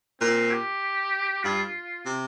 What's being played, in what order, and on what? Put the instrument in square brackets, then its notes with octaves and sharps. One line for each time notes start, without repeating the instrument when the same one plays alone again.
[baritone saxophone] A#2 [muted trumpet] C4
[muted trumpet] G4
[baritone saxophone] G2 [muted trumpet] F4
[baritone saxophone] C3